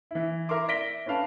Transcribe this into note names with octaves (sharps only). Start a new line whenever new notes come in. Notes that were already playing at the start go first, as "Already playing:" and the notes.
E3 E4
E4 A#4 E5 C6 D6
D5 E5 A#6 B6 D7 G7
C#4 D4 B4 F5 A5